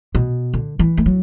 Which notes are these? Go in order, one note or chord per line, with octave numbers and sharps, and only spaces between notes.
B2
D3
E3
A3
F#3